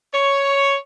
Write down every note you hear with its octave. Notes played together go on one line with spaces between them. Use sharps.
C#5